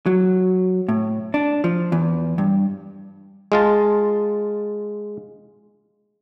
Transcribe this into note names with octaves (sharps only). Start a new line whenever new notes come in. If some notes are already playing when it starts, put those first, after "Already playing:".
F#3
A2
D4
F3
E2
G2
G#3 F4 A5